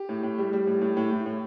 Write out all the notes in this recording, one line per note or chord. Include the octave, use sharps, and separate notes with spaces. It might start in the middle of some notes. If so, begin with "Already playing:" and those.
Already playing: G4
A2
A2
G3
G3
A2
A2
A2
A2
A2